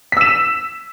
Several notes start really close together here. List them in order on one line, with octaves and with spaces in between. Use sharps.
B6 E6 E7